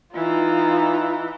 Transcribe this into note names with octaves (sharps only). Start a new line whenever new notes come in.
E3 D#4 F4